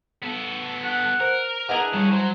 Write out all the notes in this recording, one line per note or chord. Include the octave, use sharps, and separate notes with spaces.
B3 A4
F#5
A#4 C5
D4 E4 G#4 B4 D#5 F#5 A#5
D#3 G3 C#5
F#3 C5